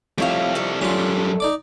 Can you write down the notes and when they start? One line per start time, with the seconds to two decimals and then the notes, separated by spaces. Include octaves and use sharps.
0.18 F2 G3 A3 E4 C#5 F5
0.55 A3 D4 A4
0.81 F#2 G3 C#4 F4
1.40 D#4 D5 D6